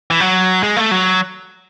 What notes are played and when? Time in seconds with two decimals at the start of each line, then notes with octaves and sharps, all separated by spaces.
0.10 E3
0.20 F#3
0.63 G#3
0.77 A3
0.91 F#3